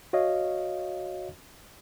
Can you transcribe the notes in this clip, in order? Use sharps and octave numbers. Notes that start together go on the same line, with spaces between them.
F#4 C#5 D#5 F5